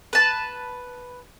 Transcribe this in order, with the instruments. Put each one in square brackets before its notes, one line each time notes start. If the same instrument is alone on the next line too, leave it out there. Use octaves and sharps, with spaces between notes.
[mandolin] B4 A5